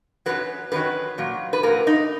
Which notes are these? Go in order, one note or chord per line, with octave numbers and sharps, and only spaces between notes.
F#2 D#3 F#3 B4
F#2 D#3 F#3 B4
A#2 F#3
B4
A#2 F#3 A#4
D#4